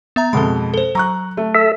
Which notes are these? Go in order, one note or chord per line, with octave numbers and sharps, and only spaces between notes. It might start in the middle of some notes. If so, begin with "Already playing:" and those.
B3 E5 A#5
F2 B2 G#3 A4 B5
A4 C5
F#3 A#5 C#6 F#6
A3
A4 E5